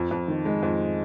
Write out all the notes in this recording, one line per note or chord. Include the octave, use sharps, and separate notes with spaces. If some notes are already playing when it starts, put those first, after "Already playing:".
Already playing: F2
F2
D#3
G#3
F2